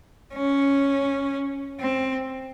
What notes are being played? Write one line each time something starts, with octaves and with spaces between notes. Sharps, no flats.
C#4
C4